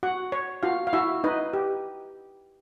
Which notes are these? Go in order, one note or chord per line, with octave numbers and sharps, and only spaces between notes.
F#4 F#5
C#5
F4 F#4 F5
F5
E4 F#4 E5
D#4 B4 D#5
G4